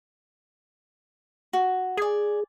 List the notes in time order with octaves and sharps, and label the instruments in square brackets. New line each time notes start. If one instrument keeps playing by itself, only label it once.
[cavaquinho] F#4
[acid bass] G#4 [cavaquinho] D5 G#5